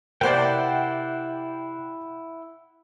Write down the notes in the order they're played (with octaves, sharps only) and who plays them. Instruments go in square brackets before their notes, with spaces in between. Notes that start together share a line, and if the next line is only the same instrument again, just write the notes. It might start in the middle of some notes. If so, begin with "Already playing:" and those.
[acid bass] C3 [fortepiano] A#3 C5 D5 [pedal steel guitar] E4 F#5 G5